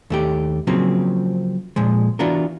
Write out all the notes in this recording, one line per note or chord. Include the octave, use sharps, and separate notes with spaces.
D#2 A3 G4
C#3 F3 F#3 A#3 C4
A#2 F3 G#3
E3 B3 D4 F4 F#4 A#4